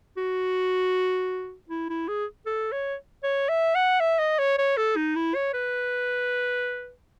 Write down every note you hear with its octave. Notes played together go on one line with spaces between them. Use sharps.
F#4
E4
E4
G#4
A4
C#5
C#5
E5
F#5
E5
D#5
C#5
C#5
A4
D#4
E4
C#5
B4